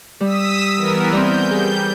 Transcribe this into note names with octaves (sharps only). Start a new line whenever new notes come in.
G3 D#6 E6 B6
E3 B3 A#4
G3 C4 G6
G3 G#4 G6